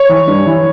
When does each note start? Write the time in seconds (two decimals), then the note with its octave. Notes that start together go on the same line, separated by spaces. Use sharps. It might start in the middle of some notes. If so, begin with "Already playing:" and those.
Already playing: C#5
0.09 E3
0.27 G2
0.46 E3